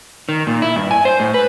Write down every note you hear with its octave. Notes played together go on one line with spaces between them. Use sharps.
D#3
A#2
E4
G2
G#5
C5
A2
B4